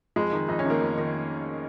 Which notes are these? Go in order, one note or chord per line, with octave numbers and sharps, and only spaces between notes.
F2 G#3
D#3
F2 D#4
C#4
D#3 A#3
F2
D#3